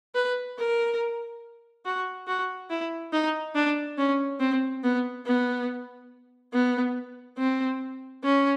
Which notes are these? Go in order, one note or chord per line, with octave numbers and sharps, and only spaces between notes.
B4
A#4
F#4
F#4
E4
D#4
D4
C#4
C4
B3
B3
B3
C4
C#4